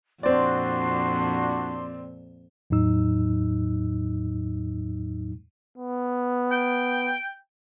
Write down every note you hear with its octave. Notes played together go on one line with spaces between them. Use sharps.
F2 A#2 C4 D4 F#4 D5 C6
E2 A2 F#3 D#4 E6
B3
G5